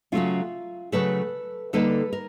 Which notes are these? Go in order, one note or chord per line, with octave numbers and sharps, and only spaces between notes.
C#3 F#3 A3 C#4 F4
C#3 F#3 A3 C#4 A4 B4
D3 G3 A#3 D#4 A4 B4
A#4